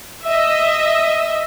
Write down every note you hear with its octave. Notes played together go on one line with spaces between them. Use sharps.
D#5 E5